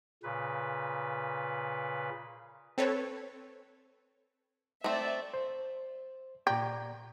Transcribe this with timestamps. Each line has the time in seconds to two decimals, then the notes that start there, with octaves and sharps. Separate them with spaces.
0.23 A#2 C#3 B4
2.78 C4 A4 B4 C#5
4.84 A3 C4 D5 E5
5.34 C5
6.47 A#2 G4 D5 A#5